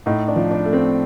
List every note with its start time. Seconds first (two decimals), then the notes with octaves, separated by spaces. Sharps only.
0.06 A2 D#4
0.28 D4
0.36 F3
0.51 D4
0.65 A3
0.73 C4